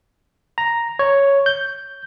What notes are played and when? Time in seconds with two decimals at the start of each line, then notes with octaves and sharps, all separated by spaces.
0.58 A#5
0.99 C#5
1.46 G6